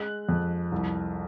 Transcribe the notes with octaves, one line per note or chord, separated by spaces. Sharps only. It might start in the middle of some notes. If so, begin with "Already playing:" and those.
Already playing: G#3 F#6
F2
C2